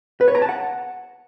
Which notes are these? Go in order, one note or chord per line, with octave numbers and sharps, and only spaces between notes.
B4
C#5
A#5
A5
F#5